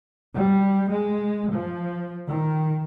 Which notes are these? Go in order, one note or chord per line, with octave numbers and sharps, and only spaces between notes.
G3
G#3
F3
D#3